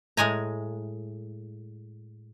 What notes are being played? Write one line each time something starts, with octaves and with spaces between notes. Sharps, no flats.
A2 G#3 G#5 A#5